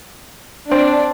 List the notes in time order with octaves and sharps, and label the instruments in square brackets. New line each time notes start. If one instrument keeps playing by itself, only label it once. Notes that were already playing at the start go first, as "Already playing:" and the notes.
[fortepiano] C4 [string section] D4